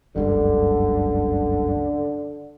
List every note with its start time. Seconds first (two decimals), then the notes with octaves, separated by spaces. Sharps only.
0.16 F#1 C#2 G2 D3